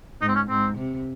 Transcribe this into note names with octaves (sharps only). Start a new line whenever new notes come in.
G#2 D#4
C4
C#4
G#2 C4
C3